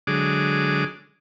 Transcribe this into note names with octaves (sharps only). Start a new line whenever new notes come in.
D3 F#3 G#3 G#4 D6